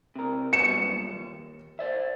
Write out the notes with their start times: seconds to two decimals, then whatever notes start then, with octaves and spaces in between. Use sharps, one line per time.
0.16 C3 A#4
0.53 G3 B3 F#4 C#7 E7
0.71 B1 G2 A#2
1.11 D#2
1.79 C5 D5 E5